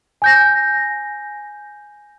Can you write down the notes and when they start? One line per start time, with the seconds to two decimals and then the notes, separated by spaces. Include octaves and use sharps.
0.22 G#5 G6 A#6